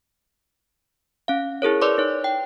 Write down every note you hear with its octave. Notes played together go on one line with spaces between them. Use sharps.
C#4 F5
E4 G#4 A#4 C#5
B4 D5 C6 D6
D#4 C#5
G5